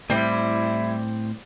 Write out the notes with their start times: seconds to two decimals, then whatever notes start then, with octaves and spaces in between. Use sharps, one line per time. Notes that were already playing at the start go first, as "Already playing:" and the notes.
0.10 A2 G3 C4 E4